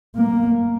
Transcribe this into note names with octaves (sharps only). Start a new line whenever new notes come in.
A#3